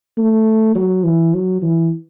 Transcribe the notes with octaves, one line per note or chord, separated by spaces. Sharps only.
A3
F#3
E3
F#3
E3